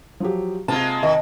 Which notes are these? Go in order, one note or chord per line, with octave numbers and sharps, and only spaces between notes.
F3 F#3 G4
C3 G#3 A#3 F4 A5
D#3 D#5